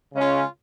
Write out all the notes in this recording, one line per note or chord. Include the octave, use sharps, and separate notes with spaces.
C#3 G#3 C#4 F4